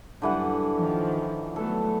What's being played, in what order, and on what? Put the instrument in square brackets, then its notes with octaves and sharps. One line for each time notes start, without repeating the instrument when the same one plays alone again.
[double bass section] F#1 G3 [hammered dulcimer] D3 E3 F#5
[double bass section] D#3 F3
[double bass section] F#3 A3 B3 [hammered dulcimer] A4